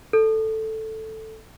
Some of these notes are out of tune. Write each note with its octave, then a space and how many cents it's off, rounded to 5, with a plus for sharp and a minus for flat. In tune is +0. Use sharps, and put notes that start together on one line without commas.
A4 +0